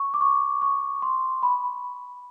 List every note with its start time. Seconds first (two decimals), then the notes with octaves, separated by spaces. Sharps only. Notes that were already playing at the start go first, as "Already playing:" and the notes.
Already playing: C#6
0.14 D6
0.21 C#6
0.62 C#6
1.02 C6
1.43 B5